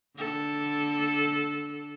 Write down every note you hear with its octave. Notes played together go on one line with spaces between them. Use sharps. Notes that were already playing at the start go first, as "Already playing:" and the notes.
D3 A4